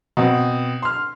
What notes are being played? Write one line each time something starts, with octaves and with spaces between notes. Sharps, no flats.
B2 C4
C6 F6